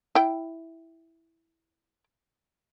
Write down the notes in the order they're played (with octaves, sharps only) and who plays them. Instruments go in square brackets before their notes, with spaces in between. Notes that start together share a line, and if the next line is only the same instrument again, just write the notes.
[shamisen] E4 G5